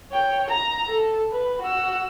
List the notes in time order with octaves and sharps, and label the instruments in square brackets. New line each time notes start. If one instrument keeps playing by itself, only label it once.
[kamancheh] C#5 G5
A#5
A4
B4
F#4 E6